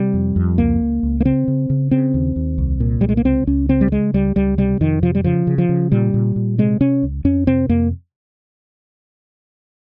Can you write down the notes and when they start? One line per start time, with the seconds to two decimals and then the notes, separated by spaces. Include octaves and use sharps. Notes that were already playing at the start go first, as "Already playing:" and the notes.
Already playing: C3 G3
0.14 F2
0.36 F2
0.58 C#2 A#3
0.81 C#2
1.03 C#2
1.20 A#3
1.25 C#3 C4
1.48 C#3
1.70 C#3
1.91 C#3 C4
2.14 D#2
2.36 D#2
2.58 C2
2.80 A#2
3.01 C2 G3
3.09 G#3
3.17 A#3
3.25 C#2 C4
3.47 C#2 C#4
3.69 C#3 C4
3.81 G3
3.92 C#3 G#3
4.14 C#2 G3
4.36 C#2 G3
4.58 C3 G3
4.81 F2 D#3
5.03 C3 F3
5.15 G3
5.24 C#3 F3
5.47 C#3
5.58 F3
5.69 C#3
5.92 A#2 G3
6.14 A#2
6.36 A#2
6.58 C3 G#3
6.80 C3 C#4
7.03 C#2
7.25 F2 C#4
7.47 C3 C4
7.69 F2 A#3